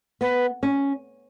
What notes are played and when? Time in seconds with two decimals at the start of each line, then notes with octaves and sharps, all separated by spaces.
0.21 B3 B4
0.63 C#4